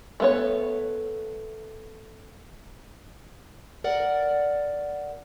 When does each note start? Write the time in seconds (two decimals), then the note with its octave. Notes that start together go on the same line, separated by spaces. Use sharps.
0.20 A3 B3 C#5
3.84 A#4 D5 F#5